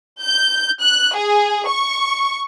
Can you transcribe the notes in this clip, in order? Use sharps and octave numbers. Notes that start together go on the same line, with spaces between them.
G6
F#6
G#4
C#6